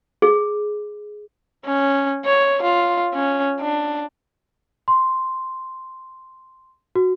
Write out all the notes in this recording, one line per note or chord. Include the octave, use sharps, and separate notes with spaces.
G#4
C#4
C#5
F4
C#4
D4
C6
F#4